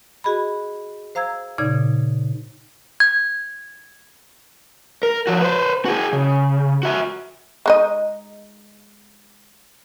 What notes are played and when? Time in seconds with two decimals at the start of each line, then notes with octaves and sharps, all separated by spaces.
0.24 F#4 G#4 D#5 B5
1.15 C5 F5 A#5 E6 G#6
1.58 A#2 C#3 D#4 D5 G#6
3.00 G#6
5.03 A#4
5.27 F3 F#4
5.41 B4 C5
5.85 F#4 G#4
6.13 C#3
6.83 F#4 E5
7.66 G#3 D#4 D#5